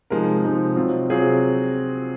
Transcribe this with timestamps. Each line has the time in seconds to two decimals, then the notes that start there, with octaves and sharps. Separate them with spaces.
0.10 C3 F3 G#3 D#4 A#4
0.44 C3 F3 G#3 D#4
0.76 C3 F#3 C4 F4
1.10 C3 F#3 C4 F4 G#4